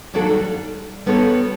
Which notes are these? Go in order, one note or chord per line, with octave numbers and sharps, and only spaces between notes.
D#2 F#3 D4 F#4 A4 D5
G3
G3 B3 F#4 A4 B4 C#5